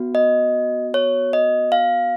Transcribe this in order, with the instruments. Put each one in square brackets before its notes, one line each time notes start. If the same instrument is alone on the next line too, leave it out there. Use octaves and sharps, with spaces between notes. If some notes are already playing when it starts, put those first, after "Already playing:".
Already playing: [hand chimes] B3 F#4
D#5
C#5
D#5
F5